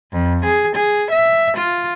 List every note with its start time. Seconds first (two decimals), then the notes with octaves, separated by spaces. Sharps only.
0.12 F2
0.45 G#4
0.76 G#4
1.11 E5
1.57 F4